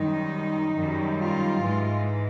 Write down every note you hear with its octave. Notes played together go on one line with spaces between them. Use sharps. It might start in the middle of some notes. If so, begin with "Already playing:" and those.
Already playing: F#2 D#3 G3 D#4
F#2 D#3 G3
F4
G#2 E3 G#3